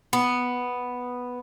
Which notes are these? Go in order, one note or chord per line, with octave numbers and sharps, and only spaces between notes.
B3